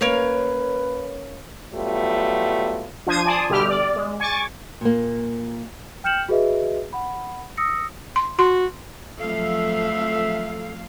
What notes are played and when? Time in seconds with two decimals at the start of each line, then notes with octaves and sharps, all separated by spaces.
0.01 A#3 C#4 A#4 B4 C#5 F5
1.73 F#3 G3 A3 B3 F4
3.07 F3 D4 C5 D#6 G#6 D#7
3.26 D5 G#5 A5 C6 D#6
3.49 B2 D3 G3 G4 E5 F6
3.69 D5
3.96 G#3
4.20 G#5 C#6 D6 A6
4.81 A#2 A#3
6.04 G5 F6 G6 C#7 E7 F#7
6.28 F#4 G#4 B4 D#5 E5
6.93 F#5 B5
7.57 D#6 E6 A#6 C#7
8.16 C6
8.39 F#4 C6
9.18 F2 F3 F#3 A3 A4 E5 F5